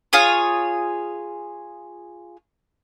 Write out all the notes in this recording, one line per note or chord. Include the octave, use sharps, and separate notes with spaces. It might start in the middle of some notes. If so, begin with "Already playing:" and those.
F4 G#4 C#5 D#6